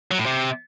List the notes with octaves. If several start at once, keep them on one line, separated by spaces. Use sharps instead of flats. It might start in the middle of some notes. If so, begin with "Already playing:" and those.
F#3
A2
C3